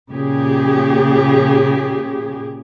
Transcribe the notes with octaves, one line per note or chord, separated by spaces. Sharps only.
A#2 C#3 G4 G#4